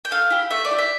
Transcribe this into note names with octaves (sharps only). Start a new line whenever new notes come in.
G5
A3 F5
E4 G4
A3 E5
D5
E4 G4
E5